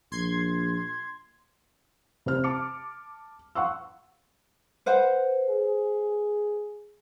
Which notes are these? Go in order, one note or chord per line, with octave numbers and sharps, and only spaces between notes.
A#1 C6 G#6
C3 C5 F6
A5 D6 C#7
F5 F#5 C6 C#6 E6
B4 C5 F#5
G#4